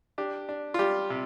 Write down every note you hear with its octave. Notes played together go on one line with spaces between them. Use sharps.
D4 G4
D4
F4
G3 G4
C3